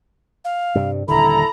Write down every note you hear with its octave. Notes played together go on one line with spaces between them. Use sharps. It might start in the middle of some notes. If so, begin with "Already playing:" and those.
F5
G2 C3 G3
D#1 D3 E4 A4 A#5 B5